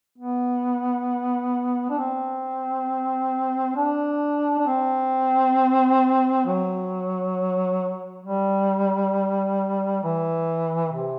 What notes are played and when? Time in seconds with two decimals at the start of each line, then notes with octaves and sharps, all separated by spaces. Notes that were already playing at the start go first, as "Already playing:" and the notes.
0.18 B3
1.90 D4
1.98 C4
3.76 D4
4.59 D4
4.67 C4
6.46 F#3
8.24 G3
10.03 E3
10.93 C3